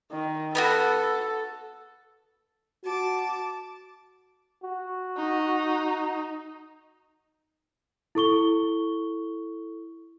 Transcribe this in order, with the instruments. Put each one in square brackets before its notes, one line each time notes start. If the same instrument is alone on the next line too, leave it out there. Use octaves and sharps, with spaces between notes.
[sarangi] D#3
[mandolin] B3 D#4 F#4 [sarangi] A4
[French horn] F#4 [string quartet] A5 D6
[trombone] F#4
[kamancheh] D#4
[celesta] E4 A4 C#6 G7